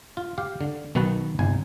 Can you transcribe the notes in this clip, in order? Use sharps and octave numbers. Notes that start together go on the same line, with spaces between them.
F4
G4 F5
D3
B1 D#3 B3 F#4 B4 A5
G1 C2 G#5